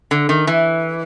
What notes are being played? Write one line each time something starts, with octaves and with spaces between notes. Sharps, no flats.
D3
D#3
E3